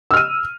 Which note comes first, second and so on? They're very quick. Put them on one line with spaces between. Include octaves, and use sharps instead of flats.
E6 F6 D#7